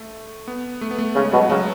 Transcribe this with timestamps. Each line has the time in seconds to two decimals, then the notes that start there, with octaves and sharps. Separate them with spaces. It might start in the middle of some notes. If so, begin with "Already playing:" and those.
Already playing: A3
0.48 B3
0.81 A3
0.91 B3
0.99 A3
1.15 C#3 G#3
1.32 B2 F#3
1.49 C#3 F#3